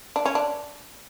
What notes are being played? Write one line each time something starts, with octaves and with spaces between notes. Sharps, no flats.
D4
C#4
D4